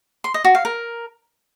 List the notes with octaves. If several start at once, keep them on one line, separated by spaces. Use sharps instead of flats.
C6
D#5
F#4
F5
A#4